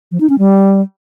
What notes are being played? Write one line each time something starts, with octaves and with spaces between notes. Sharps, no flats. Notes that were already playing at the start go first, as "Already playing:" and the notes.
F3
D#4
C#4
G3